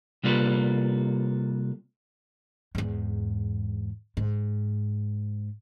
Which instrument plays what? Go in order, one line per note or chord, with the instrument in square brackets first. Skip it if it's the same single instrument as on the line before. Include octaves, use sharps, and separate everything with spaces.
[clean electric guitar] C3 G3 A#3 F4 A4 B4
[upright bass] E2 G#2
G#2